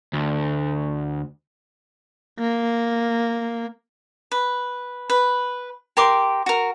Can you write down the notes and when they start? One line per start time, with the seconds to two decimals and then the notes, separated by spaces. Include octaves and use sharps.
0.13 D2
2.39 A#3
4.32 B4
5.10 B4
5.97 G4 A#4 C6 D6
6.46 F#4 A#4